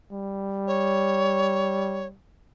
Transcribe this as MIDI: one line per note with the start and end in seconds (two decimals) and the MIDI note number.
0.12 2.16 55
0.67 2.07 73